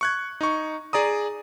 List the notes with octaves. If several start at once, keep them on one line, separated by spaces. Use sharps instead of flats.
C#6 F#6 G#6
D#4 C#6
G#4 D5 A#5 D#6